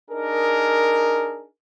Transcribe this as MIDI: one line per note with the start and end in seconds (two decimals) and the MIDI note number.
0.11 1.46 62
0.11 1.46 63
0.11 1.46 68
0.11 1.46 70